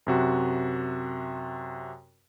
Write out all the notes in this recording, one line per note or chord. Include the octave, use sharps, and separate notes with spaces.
F#2 C3 F#4